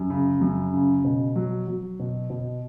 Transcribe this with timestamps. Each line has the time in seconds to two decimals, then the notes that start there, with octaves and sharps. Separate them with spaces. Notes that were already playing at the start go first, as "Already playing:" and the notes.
Already playing: F#2
0.10 C#3
0.41 F#2
0.74 C#3
1.04 B2
1.36 F#3
1.67 F#3
1.99 B2
2.30 B2